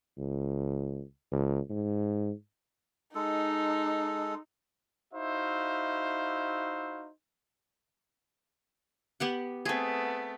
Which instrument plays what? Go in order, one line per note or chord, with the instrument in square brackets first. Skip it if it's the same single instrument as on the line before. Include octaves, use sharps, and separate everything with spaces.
[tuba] C#2
C#2
G#2
[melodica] G#3 A4 [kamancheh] D#4
[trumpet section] D#4 E4 F#4 C5 E5 F5
[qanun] B3 G4 F#5
[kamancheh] A3 B3 [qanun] C4 G#4